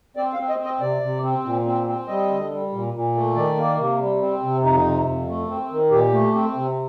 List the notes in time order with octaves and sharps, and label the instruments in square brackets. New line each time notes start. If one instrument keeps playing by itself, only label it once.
[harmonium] C4 D5
F5
C4
D#5
C4
D#5
C3 D5
C3
C4
A#2
C4
C4
G3 D#5
D3
G3
A#2
A#2
A3
D#3 D5
A#3
C3
G3
C4
C3
F2 D#4
C3
F2
A3
C4
D#3
A#2 G4
A3
C4
C3